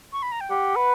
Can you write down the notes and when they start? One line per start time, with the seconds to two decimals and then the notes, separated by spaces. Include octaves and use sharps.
0.13 C#6
0.22 B5
0.32 A#5
0.41 G5
0.50 G4 F#5
0.76 B4